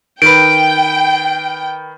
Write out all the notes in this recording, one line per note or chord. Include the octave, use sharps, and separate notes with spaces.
D#3 B4 G5 D7